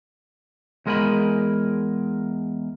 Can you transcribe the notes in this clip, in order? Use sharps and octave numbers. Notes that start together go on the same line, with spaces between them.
E2 G#3 A#4 D5 G#5 B5